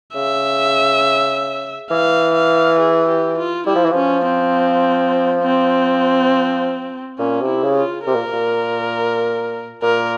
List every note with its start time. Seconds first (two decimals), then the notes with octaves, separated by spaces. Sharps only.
0.15 C#3 E5
1.90 E3 F5
2.35 F5
2.79 G#4
3.08 G4
3.38 F4
3.66 G3 E4
3.75 F3
3.84 E3
3.92 F3 C#4
4.26 C4
5.43 C4
7.19 A#2 C#4
7.41 C3
7.47 E4
7.63 C#3
7.78 F4
8.06 C3 A#4
8.15 A#2
8.33 A#2
9.82 A#2 A#4